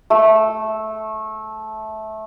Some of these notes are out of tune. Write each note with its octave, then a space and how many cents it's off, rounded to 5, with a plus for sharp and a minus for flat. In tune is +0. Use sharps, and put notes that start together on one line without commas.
A3 -15